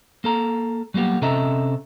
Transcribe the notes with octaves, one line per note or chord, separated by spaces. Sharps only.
A#3 A4 A#5
F#3 G3 A#3 B3 G4
C3 C#4 A4 D#5 E5 A#5